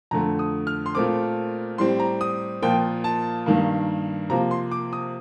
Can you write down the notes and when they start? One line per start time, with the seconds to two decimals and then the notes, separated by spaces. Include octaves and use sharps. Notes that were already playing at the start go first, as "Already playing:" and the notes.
0.11 F2 D3 A3 A#5
0.39 D#6
0.67 F6
0.86 C6
0.95 A#2 A3 C4 D6
1.78 A2 G3 C4 C6
2.00 A#5
2.21 D#6
2.62 A#2 F3 A#3 G5
3.04 A5
3.46 G2 D#3 A#3
4.30 C3 F3 A#3 A#5
4.51 C6
4.71 D6
4.93 D#6